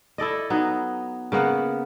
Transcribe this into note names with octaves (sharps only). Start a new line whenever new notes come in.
E4 A4 D5 D#5
F#3 B3 D#4
C#3 A#3 B3 F#5